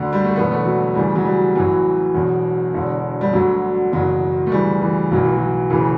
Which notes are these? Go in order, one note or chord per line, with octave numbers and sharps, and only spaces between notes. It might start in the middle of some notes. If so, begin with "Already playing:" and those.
Already playing: D2 D3
G3
A3
E1 E2 D3 B3
A3
F#3
D2 C#3 E3 G3
F#3
G3
A1 A2 E3 F#3
E1 E2 B2
E1 E2 D3
G3
D2 D3 F#3
F#1 E2 B2 F#3
A3
D2 C#3 E3 G3
E3
B1 A2 E3 F#3
E3
F#3
E1 D2 C#3 E3